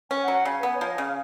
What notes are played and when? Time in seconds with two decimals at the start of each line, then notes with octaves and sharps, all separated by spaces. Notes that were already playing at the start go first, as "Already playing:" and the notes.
0.11 C#4 G#5
0.23 F#5
0.28 F#3
0.33 F#5
0.45 C#3 G#5
0.59 B3 B4
0.74 C#5
0.81 F3
0.88 D#5
0.98 C#3 F5